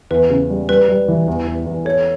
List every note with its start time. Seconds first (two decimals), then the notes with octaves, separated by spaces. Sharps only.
0.10 E2 B4
0.30 C#3
0.50 G3
0.69 G3 B4
0.89 G3
1.08 E3
1.28 E2
1.47 E2
1.66 E2
1.85 A4 C#5